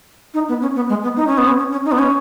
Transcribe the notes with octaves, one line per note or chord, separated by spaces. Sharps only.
D#4
B3
C#4
B3
G#3
B3
D#4
C#4
B3
C#4
C#4
C#4
D#4
B3
C#4